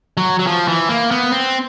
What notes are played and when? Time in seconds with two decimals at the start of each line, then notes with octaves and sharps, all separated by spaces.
0.17 F#3
0.39 F#3
0.47 F3
0.68 E3
0.89 A#3
1.11 B3
1.32 C4